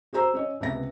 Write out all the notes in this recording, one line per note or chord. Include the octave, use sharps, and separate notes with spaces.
F#4 G#4 C5 A#5 E6
C#4 C#5 D#5
C#2 C3 B3 E5 A#6